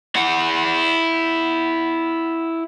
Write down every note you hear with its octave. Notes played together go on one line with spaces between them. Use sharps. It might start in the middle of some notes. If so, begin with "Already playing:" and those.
E4 F#5